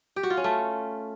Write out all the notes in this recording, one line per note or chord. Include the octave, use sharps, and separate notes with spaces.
G4
F#4
F4
C#4
A3